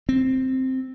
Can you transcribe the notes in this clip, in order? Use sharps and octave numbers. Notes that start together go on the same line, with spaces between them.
C4